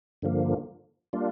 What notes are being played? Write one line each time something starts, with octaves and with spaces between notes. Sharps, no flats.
G2 D3 F3 A#3
G3 A#3 D4 F4